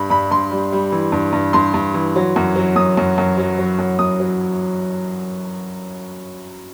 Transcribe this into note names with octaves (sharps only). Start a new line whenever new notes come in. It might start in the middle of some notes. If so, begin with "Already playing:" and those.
Already playing: G2 G3 B5
G2 B5
G2 C6
G3
G3
E3
G2
G2
G2 C6
G2
E3
F#3
F#2
F#3
F#2 D#6
F#2
F#2
F#3
F#3
F#2
F#2 D#6
F#3